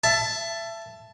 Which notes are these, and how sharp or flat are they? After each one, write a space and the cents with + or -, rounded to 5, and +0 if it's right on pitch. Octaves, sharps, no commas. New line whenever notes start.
E5 +25 A5 +0